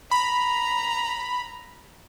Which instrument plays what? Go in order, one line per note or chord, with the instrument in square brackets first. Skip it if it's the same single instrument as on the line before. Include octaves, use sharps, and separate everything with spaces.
[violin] A#5 [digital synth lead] B5